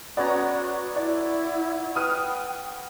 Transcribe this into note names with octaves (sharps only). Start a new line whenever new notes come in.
B3 C#4 F#4 C#5 D5 A#5
E4 D5
B4 G5 D#6 F6 D#7